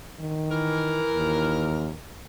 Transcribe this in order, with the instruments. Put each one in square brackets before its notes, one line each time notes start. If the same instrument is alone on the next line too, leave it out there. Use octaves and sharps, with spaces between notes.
[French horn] D#3
[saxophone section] E3 A#4
[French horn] D#2